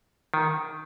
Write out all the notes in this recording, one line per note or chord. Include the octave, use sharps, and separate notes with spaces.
D#3